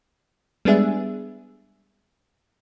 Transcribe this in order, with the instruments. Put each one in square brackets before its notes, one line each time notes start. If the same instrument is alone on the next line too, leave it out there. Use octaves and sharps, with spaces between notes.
[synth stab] G3 G#3 B3 D4 G#4 E5